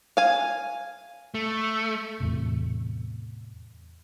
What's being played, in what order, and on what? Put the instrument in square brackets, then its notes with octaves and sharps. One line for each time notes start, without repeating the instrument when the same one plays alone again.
[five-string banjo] F5 G#5
[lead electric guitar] A3
[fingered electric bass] E2 A2 C3